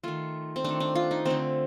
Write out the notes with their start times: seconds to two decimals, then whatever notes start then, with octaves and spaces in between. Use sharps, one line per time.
0.04 D#3 A3 F4
0.56 C4
0.64 D#3 A3 D4
0.80 D4
0.95 F4
1.11 D#4
1.26 D3 A3 C4